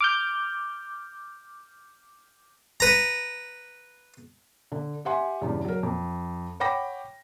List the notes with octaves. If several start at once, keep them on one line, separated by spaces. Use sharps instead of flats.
D6 F6 G6
B4 A#5
D3
G4 E5 F#5 G#5 C6
E2 G2 C#3
F#3 A#4
F2
C#5 F#5 G5 B5 D6 A#6